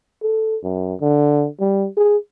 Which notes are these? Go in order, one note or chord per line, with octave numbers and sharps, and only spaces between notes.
A4
F#2
D3
G3
G#4